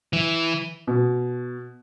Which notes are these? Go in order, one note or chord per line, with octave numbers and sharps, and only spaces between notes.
E3
B2